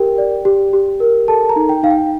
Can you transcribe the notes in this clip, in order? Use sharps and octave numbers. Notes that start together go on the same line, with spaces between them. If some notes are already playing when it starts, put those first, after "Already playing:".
Already playing: G4 A#4 G5
D5
G4
G4
A#4
A4 A5
A#5
D#4
G5
D#4 F5
G5